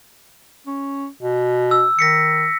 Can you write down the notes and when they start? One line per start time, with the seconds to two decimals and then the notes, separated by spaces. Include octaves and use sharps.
0.67 C#4
1.23 B2
1.71 E6
1.99 D#3 A#6 B6 C#7